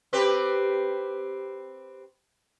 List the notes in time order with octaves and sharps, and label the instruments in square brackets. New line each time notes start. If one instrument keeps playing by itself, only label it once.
[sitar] C4 G4 B4